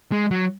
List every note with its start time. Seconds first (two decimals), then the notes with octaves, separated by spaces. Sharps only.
0.12 G#3
0.31 F#3